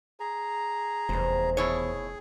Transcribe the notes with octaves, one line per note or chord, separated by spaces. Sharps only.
G#4 A#5
F1 E2 C5
B2 E4 G#4 C#5